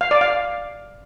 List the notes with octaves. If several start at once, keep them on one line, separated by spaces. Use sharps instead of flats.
F5
D5
F5